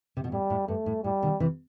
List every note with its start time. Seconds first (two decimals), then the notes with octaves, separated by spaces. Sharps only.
0.17 C3
0.24 B2
0.32 A2 G3
0.50 A2
0.68 G2 A3
0.86 A2
1.04 A2 G3
1.22 B2 D#3
1.40 C3 E3